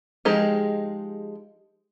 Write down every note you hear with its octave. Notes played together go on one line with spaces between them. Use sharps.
F3 G#3 D#4 G4 G#4